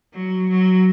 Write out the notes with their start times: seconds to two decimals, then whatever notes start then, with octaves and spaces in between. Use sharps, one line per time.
0.14 F#3
0.49 F#3